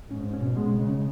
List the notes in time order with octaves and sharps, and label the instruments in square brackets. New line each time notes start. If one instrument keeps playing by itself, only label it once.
[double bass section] G#2 [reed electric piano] C#4
[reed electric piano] C#4
[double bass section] B2
[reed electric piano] G#3
[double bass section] C#3
[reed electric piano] C#4